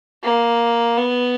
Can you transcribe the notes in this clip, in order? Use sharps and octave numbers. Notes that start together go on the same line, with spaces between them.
A#3
B3